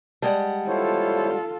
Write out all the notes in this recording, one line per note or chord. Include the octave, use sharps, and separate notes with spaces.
G3 G#3 D5 F#5 A5
E4 F4 A4 C5 C#5